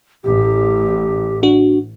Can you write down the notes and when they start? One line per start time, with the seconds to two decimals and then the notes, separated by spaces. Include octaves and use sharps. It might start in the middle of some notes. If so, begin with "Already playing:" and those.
0.24 A1 G4
1.43 D4 F#4